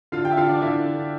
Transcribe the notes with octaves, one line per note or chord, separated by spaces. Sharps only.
D3 F4 F5
G4 G5
E5
D3 F4 F5
D4 D5
D3 E4 E5
D3